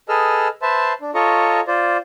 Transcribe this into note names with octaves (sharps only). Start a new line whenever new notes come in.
G#4 A4 B4 D#5 E6 F6
B4 C5 E5 A5 C6
D4
F4 A4 C#5 D#5 A#5 C#6
F4 C5 D5